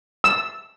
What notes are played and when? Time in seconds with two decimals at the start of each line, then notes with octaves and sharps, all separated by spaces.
0.24 E6